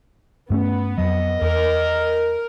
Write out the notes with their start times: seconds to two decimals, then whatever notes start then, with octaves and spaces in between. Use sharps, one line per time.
0.50 G2 A3 B3 C#4
0.98 F2 F#3 D#5
1.41 E2 A#4